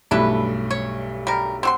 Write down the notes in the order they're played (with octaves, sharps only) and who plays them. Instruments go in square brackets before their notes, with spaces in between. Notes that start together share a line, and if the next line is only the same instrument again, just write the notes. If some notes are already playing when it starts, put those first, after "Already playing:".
[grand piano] B1 G2 A3 [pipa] D4 E4 B4
[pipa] C#5
G3 A#4
C4 F#4 C6